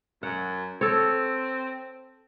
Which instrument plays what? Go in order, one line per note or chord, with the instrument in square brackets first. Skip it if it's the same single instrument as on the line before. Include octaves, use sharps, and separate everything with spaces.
[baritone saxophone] F#2 [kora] F#5
[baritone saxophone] C4 [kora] A4 C#5